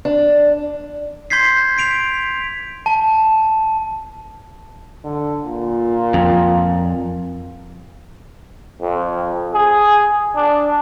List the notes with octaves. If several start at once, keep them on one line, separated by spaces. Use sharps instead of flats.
D4
C6 G6 G#6 B6 C7
B6 D7 F7
A5
D3
A#2
F2
F2
G#4
D4